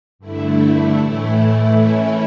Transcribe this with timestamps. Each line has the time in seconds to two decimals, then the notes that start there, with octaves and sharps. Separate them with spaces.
0.19 G2 D3 A3 E4
0.98 A2 E3 A3 E4
1.77 E3 A3 C#4 E4